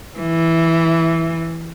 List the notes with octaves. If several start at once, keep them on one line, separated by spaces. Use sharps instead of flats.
E3